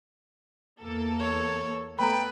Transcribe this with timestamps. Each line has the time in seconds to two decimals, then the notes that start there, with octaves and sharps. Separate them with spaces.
0.81 E2 A#3 A4
1.20 C#5
1.99 A3 B3 B4 G5 A#5 B5